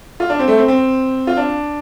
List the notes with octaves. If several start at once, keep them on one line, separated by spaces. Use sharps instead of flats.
F4
D4
C4
A3
C4
C4
F4
D4